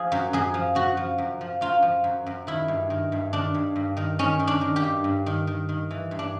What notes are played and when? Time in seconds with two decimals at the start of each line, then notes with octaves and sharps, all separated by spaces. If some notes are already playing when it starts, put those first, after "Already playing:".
Already playing: F3 G#4
0.12 F#2
0.33 F#2 G#4
0.54 F3
0.75 C#3 F#4
0.97 F3
1.18 F#2
1.41 F3
1.61 F#2 F4
1.82 F3
2.04 F#2
2.26 F#2
2.47 D#3 E4
2.68 G2
2.90 D#3
3.12 G2
3.33 D#3 D4
3.54 G2
3.76 G2
3.97 D#3
4.19 D#3 C#4
4.39 D#3
4.47 D4
4.61 D#3
4.76 G4
4.83 G2
5.04 G2
5.26 D#3
5.47 D#3
5.69 D#3
5.91 E3
6.11 G2
6.19 D4